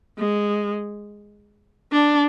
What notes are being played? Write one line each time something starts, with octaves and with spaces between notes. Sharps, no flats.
G#3
D4